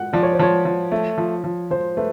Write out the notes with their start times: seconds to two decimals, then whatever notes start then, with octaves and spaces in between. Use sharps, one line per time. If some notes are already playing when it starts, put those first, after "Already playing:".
Already playing: F#5
0.13 F3 D5
0.23 C#5
0.33 C5
0.39 F3 C#5
0.65 F3
0.92 A3
1.18 F3
1.44 F3
1.70 F3 C5
1.97 A3 B4